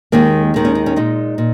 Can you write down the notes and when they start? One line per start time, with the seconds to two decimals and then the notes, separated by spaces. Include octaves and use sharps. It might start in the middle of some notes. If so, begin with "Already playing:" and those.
0.12 D#2 D#3 G#3 A#3
0.54 D#2 D#3 G#3
0.65 C#4
0.75 D#4
0.86 C#4
0.96 A#2 G#3 D#4
1.38 A#2